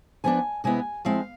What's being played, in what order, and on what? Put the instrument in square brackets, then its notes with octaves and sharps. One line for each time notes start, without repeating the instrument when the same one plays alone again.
[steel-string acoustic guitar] F3 B3 D4 G#5
C3 G#3 B3 E4 G#5
F3 G#3 C4 E4 F5